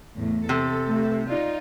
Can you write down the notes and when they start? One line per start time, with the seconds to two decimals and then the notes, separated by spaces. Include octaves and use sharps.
0.16 E2 A2
0.49 C3 A4
0.88 A3
1.29 D#4 F4 D5